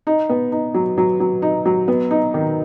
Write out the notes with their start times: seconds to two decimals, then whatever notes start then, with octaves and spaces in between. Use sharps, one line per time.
0.07 D#4
0.29 B3
0.52 D#4
0.74 F#3
0.98 F#3
1.20 F#3
1.42 D#4
1.66 F#3
1.88 B3
2.11 D#4
2.34 D#3